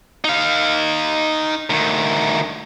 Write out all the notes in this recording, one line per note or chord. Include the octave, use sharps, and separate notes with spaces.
D#4 F5
D2 D#3